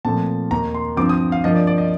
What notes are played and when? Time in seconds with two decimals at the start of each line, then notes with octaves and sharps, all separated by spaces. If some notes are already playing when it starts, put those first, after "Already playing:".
0.05 A#2 F3 A3 C4 A5
0.51 D#2 D#3 A#3 A#5
0.74 C6
0.97 G2 F3 C4 D6
1.09 D#6
1.32 F5
1.44 G2 F3 A#3 D#5
1.55 D5
1.67 D5
1.78 D#5